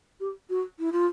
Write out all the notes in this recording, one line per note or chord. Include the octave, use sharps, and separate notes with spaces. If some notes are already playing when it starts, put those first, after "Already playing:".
G4
F#4
E4
F4